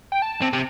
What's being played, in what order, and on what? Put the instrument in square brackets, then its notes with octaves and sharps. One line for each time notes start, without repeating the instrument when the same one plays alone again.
[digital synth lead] G5
A5
[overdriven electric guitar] C3
C3